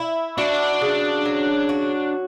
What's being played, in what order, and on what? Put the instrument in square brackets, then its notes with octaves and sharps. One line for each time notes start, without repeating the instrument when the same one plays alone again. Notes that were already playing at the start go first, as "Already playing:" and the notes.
Already playing: [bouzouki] E4
[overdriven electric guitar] D4 [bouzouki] F#4
[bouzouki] C#3
F#3
F#4